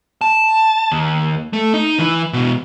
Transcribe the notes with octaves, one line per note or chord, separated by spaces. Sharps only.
A5
D#2
A3
D#4
E3
B2 E3